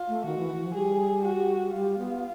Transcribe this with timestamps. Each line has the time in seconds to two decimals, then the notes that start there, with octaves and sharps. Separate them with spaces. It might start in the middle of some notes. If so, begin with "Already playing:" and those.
Already playing: F4
0.08 A3
0.25 D#3 F#4
0.38 E3
0.62 F3
0.74 G3 G#4
1.24 F#4
1.74 G3 F4
1.98 B3